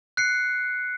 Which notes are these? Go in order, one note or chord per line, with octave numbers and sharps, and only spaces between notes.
F#6 C7 C#7